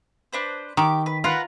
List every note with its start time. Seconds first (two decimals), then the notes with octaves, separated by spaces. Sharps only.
0.33 D4 B4 C5
0.77 D#3 G4 D6
1.06 B4
1.24 F4 A#4 B4 F#5